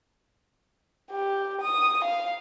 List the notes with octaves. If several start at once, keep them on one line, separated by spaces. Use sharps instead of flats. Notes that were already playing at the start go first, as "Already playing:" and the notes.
G4
D#6
F5